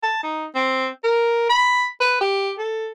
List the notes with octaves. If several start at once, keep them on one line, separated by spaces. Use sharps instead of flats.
A5
D#4
C4
A#4
B5
B4
G4
A4